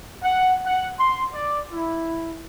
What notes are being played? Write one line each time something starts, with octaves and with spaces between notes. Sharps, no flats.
F#5
F#5
C6
D5
E4